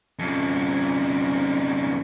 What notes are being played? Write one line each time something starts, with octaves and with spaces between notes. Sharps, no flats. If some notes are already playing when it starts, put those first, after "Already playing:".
F2 C#3